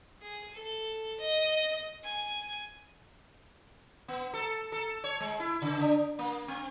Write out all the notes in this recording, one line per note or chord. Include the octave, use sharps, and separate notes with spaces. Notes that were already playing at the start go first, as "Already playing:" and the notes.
G#4
A4
D#5
G#5
B3
A4
A4
C#5
G#3
E4
C#3
D4
A#3
C4